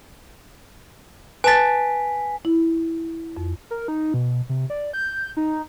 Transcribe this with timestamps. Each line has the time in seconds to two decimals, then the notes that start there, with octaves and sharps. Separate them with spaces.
1.44 B4 G#5 A5 A6 B6
2.45 E4
3.37 F2
3.71 A#4
3.88 D#4
4.14 B2
4.49 C3
4.70 D5
4.93 G6
5.37 D#4